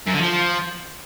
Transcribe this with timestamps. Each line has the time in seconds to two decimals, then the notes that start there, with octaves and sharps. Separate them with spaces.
0.06 F#2
0.14 D3
0.21 F3